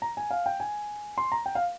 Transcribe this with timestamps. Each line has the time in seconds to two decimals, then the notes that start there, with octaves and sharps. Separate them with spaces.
0.02 A#5
0.17 G#5
0.31 F5
0.46 G5
0.60 G#5
1.18 C6
1.32 A#5
1.46 G5
1.55 F5